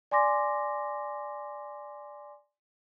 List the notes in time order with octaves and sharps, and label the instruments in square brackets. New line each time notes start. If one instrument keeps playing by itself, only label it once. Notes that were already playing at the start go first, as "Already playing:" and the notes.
[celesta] D5 G#5 C6 D6 A#6